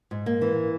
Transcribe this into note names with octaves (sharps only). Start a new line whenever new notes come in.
G#2
A#3
E3